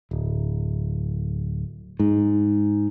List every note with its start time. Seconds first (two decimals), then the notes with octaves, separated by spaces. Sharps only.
0.11 D1
2.00 G#2